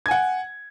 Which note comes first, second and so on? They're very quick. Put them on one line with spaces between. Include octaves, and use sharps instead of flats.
G#6 G#5 F#5